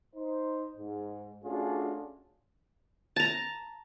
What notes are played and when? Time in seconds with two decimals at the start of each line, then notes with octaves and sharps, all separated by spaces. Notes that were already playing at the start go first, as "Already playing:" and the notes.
0.14 D#4 C5
0.76 G#2
1.43 A3 C#4 D4 F4 F#4 G#4
3.16 A5 A#5